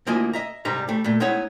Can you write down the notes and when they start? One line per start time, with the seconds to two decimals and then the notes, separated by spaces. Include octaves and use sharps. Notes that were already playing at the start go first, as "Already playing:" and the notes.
0.07 D2 F3 A#3 E4 D#5 G#5
0.33 D#5 E5 A#5
0.65 G#2 C3 G3 D#4 B4 A#5
0.89 G3 A3
1.04 A#2 A3
1.20 G#3 B3 D#4 E4 C#5 F#5